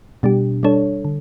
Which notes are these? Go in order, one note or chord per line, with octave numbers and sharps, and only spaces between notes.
B2 G3 D4 G4
G3 D4 A4 C#5
D3